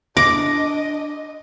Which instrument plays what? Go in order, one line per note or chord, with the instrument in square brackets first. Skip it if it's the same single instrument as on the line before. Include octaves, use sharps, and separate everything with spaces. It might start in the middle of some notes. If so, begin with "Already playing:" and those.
[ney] D4 [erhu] D#5 [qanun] D6 [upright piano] A#6